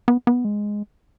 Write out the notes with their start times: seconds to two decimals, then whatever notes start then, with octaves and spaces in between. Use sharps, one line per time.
0.08 B3
0.27 B3
0.45 G#3